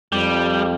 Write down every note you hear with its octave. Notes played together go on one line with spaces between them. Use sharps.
F2 G3